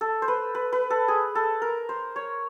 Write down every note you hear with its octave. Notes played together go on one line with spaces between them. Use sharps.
A4
C5
B4
B4
B4
A4
G#4
A4
A#4
C5
C#5